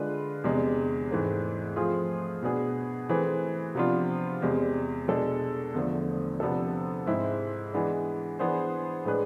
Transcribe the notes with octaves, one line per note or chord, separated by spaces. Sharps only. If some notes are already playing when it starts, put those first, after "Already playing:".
Already playing: D3 G#3 D4 F4 B4
E2 C3 G#3 D4
G#2 E3 A3 C4
F3 A3 C4 F4 G#4
B2 B3 D4 G#4
E3 A3 C4 G#4 B4
C3 F3 B3 D4 F4
E2 C3 G#3
B2 G#3 D4 A4
E2 D3 F3 A3
C3 F3 B3 D4 A4
G#2 G#3 C4 E4
E3 G#3 B3 D4
E3 B3 D4 G#4 C5
A2 G#3 D4 G#4 B4